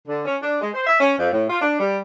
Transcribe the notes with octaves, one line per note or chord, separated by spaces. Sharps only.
D3
C#4
D4
G#3
C5
E5
C#4
F2
A2
F4
D4
G3